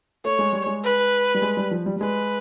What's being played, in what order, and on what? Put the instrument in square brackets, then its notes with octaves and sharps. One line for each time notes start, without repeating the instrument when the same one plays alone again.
[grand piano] A3 [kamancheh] C#5
[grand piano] G#3
G3
G#3
[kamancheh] B4
[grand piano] G3
G#3
G3
F3
G3
G3
[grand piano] G#3 [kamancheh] B4